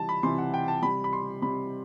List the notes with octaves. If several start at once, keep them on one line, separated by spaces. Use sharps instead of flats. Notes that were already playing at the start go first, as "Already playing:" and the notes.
Already playing: C3 E3 G3 A5
B5
C3 E3 G3 C6
F#5
G5
A5
C3 G3 B5
B5
C6
C3 G3 B5